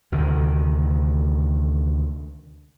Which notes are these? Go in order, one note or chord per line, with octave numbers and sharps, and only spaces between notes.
D2 C3 D#3